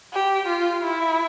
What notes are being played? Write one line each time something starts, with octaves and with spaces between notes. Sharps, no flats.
G4
F4
E4